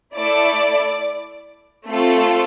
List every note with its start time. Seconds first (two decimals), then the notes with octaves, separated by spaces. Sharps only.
0.16 A3 E4 A4 D5
1.87 A3 C4 F4 A4